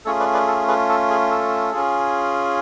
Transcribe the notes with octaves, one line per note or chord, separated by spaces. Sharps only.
A3 C#4 F4 G#4 A4 C#5
B4 D5
B4 D5
A4
G#4 B4
A4
G#4
A4
C#4 F4 G#4